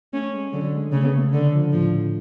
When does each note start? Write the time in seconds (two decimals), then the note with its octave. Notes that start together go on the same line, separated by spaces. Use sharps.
0.12 A3 C#4
0.33 G#3
0.52 D3 F#3
0.73 G#3
0.92 C#3 A3
1.05 B3
1.17 A3
1.33 D3
1.53 F3
1.72 A2 F3
1.92 A2